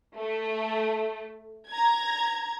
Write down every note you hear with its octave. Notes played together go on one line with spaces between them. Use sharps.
A3
A#5 G#6